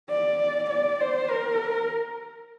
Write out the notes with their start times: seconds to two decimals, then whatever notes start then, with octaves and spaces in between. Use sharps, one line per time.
0.10 D5
0.70 D5
1.00 C5
1.30 A#4